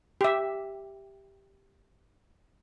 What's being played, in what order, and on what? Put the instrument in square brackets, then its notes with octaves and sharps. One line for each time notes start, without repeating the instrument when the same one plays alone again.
[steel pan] G4 E5